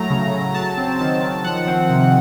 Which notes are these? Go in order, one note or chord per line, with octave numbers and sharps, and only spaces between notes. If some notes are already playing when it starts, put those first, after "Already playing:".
Already playing: A2 F#3 A3 A#5
C#3
C#3
F#3 A5
C4
D#3 A5
D#3
F3 F#5
C4
C3